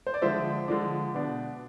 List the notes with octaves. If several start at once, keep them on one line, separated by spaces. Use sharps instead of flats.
C5
D5
D3 F3 G#3 D4 C5 E5
D3 F3 G#3 D4
B2 B3 D4